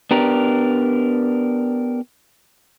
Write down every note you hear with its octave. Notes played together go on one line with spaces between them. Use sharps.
B3 D4 G4 A#4